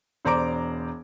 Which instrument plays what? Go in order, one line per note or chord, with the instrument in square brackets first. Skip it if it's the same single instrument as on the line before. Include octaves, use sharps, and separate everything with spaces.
[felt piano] E1 C5 D5 A#5 D6 D7